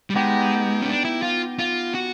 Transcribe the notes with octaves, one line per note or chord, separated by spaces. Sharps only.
G3
G#3 B3 D#4 G4
C#4
D4
E4
F4
F4
F#4